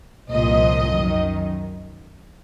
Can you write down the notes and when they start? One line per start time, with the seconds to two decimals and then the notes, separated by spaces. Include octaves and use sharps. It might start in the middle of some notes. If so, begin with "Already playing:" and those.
0.30 C2 A#2 F3 D#5
0.91 F#2 D#3